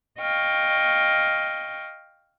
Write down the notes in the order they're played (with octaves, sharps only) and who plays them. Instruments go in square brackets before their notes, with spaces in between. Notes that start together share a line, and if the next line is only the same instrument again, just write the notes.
[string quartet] D#5 F5 G5 C#6